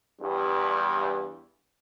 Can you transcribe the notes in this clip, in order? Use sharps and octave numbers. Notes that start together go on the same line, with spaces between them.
E2 G2